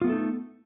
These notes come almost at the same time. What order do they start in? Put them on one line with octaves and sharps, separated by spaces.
F4 B3 A3 A4 D#4